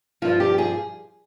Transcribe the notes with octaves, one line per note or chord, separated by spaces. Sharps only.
G2 F3 F4
G4
G#4